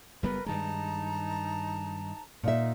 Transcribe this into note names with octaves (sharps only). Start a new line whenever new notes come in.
F#1 G3 B3 A#4 B4
G2 D#3 G#3 D#4 A5 A#5
A#2 D#4 E5